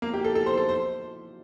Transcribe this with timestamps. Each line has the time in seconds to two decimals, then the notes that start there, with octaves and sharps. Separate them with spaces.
0.02 A#3
0.14 G4
0.25 A4
0.35 A4
0.46 C5
0.58 A4
0.69 C5